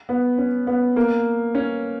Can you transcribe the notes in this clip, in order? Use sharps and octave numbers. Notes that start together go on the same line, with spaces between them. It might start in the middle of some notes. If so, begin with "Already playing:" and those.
B3
C#4
B3
A#3
C#4